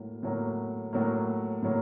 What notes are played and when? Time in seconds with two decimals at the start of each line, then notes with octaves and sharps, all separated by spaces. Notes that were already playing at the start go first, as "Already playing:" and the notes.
Already playing: A2 F#3 A#3
0.23 A2 F#3 A#3
0.93 A2 F#3 A#3
1.63 A2 F#3 A#3